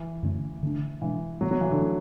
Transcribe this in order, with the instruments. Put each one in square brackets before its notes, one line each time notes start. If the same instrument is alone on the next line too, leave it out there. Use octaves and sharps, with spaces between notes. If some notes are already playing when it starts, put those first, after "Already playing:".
Already playing: [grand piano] E3
[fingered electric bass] F#2 D3 A3 C#4
D3 A3 D4
[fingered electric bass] B2 G#3 D4 [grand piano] E3
[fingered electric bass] A2 E3 A3 [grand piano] F#3
[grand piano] F#3
E3
D3
[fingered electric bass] F#3 A3 C#4